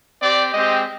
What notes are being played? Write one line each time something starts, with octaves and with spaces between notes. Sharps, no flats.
C4 G4 D5
G#3 C4 G4 D#5